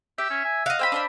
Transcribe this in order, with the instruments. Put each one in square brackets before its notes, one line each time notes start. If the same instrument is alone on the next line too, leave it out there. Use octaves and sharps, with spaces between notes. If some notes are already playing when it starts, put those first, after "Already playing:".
[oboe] G4 [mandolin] E5
[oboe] C#4
G#5
[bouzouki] D#5 F5 [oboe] F#5
[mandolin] C5 G5 B5 [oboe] E6
[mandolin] D4 C5 B5